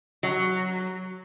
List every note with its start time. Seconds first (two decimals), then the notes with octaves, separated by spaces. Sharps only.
0.23 F#3